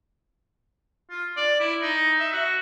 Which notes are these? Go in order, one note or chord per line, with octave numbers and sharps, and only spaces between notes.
F4
D5
E4
D#4
E5
F#4